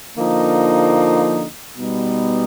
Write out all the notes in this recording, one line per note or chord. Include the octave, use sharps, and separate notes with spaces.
D3 F3 A#3 D#4
B2 G3 B3 D#4